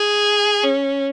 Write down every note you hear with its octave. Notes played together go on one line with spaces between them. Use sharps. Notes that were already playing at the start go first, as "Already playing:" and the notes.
Already playing: G#4
C#4